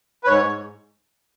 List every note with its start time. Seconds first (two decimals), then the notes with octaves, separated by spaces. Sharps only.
0.24 B4
0.27 G#2 C#5
0.44 G#2